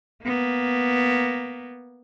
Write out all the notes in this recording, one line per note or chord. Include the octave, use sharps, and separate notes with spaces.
A#3 B3